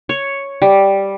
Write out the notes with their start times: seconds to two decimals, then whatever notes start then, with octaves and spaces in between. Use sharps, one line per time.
0.09 C#5
0.62 G3